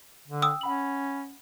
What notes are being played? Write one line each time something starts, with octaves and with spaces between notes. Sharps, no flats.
D3
G5 D#6 E6
C#4 F#5 B5 F#7